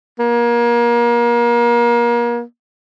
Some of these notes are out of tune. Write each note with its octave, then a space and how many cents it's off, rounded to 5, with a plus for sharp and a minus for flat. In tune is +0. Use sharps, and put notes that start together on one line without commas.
A#3 +30